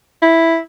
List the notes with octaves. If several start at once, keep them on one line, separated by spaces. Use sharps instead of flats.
E4